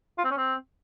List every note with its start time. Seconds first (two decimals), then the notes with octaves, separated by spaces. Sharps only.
0.18 F4
0.25 C4
0.31 C#4
0.37 C4